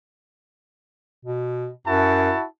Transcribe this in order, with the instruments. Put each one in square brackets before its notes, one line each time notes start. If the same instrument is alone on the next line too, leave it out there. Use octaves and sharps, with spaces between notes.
[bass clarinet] B2
[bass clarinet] F#2 [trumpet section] E4 F#4 A5